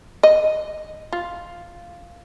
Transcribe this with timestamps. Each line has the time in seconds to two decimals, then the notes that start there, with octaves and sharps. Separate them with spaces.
0.23 D#5
1.13 F4